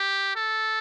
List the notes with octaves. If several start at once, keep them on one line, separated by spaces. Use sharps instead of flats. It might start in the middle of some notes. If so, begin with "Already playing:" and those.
Already playing: G4
A4